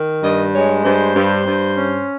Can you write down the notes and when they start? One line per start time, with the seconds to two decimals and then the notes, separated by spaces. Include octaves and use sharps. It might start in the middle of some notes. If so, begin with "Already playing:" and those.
Already playing: D#3
0.24 G2 D#5
0.54 G#3 C#5
0.84 G2 C5
1.15 G2
1.46 G2
1.76 C#4